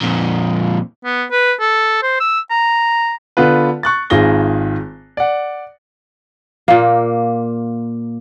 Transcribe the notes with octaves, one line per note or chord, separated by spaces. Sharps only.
F2 A#2
B3
B4
A4
C5
E6
A#5
D3 B3 F4 B4
C#6 F#6 A6
G#1 D#3 F4 G#4 A#6 G7
D5 F#5
A#2 A#3